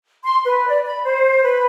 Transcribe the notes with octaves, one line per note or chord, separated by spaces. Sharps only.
C6
B4
D5
B5
C5
B4